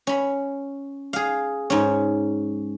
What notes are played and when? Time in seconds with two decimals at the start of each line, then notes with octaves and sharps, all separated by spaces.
0.07 C#4 B5
1.13 G#4 F5
1.70 G#2 C#4